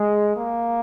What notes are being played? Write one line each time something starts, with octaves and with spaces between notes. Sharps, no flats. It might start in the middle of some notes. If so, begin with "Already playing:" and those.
Already playing: G#3
A#3